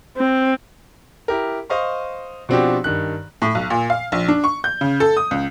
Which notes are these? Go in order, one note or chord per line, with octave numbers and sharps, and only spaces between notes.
C4
E4 G4 A#4
C5 D#5 F5 C#6
B2 F3 C4 D4 F#4 G4
G2 D#3 F#6
A2
B1
A#2
F5
A#1
D4
C#6
G6
C#3
A4
D#6
C#2